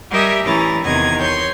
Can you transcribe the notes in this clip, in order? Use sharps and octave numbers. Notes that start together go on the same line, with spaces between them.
G3 G4 A#4 D#5 E5 G#5
A2 E3 C#4 E4 A#5 A6
E2 C3 D#3 D#5 G#6
C#5 C6 G6